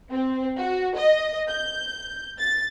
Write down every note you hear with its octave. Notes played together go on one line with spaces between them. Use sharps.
C4
F#4
D#5
G6
A6